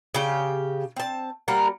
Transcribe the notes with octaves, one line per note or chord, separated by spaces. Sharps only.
C#3 G4
C4 A5
G3 A#3 A#4 F#5